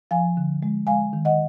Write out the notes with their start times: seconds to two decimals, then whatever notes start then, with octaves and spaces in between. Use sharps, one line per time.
0.11 F3 F5 G#5
0.37 D3
0.63 G#3
0.87 G#3 F5 G#5
1.13 D#3
1.25 D#5 F#5